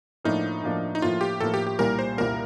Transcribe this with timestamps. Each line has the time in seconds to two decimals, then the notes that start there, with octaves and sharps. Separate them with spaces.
0.25 A2 F3 A#3 D4 D#4
0.63 A2 F3 A#3 D4
0.95 D#4
1.02 A2 F3 A#3 F4
1.21 G4
1.40 A2 F3 A#3 A4
1.54 G4
1.67 G4
1.79 C2 A#2 G3 A#3 A#4
1.99 C5
2.18 C2 A#2 G3 A#3 A#4